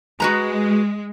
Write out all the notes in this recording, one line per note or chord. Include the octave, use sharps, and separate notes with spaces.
G#3 F#4 B4 A#5